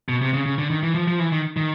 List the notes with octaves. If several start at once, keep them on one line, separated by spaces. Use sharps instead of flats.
B2
C3
C#3
C#3
D3
D#3
E3
F3
F3
E3
D#3
D#3